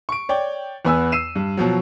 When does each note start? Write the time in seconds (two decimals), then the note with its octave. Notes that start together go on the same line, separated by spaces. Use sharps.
0.09 C#6 D7
0.29 C#5 D5 G5
0.85 E2 B3 B4 G#5 E6
1.12 E6 C7 D#7 E7
1.36 G2
1.57 B2 F3 F#3